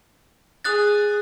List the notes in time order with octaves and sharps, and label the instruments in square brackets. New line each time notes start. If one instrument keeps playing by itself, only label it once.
[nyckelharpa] G#4 [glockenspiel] D#6 F#6 A6